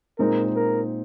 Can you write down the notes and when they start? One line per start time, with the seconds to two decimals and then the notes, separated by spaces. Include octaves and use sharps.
0.19 A#2 G#3 C4 D#4 A#4
0.56 A#4